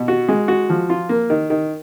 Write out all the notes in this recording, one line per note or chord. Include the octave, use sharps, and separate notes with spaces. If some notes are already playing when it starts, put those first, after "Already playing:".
Already playing: B2
F#4
G#3
F#4
F3
F4
A#3
D#3
D#3